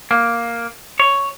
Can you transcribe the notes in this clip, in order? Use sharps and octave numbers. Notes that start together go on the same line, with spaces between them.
A#3
C#5